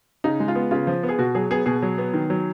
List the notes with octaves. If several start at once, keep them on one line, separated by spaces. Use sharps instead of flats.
C#3 D#4
G#3
F4
B3
C#3 F4
F3
B3
G#4
B2 F#4
F#3 G#4
B3 G#4
B2 G#4
F#3
B3
D#3
F#3